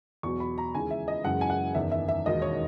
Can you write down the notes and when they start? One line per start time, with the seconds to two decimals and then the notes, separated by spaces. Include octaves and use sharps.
0.23 E2 B2 F#3 C#6
0.40 B5
0.58 A#5
0.75 D#2 C#3 E3 G#3 G#5
0.91 E5
1.08 D#5
1.24 F#1 F#2 E3 G#3 F#5
1.41 G#5
1.50 F#5
1.75 F#1 E2 D#3 E5
1.91 E5
2.08 E5
2.26 E1 D#2 D#3 F#3 D#5
2.42 C#5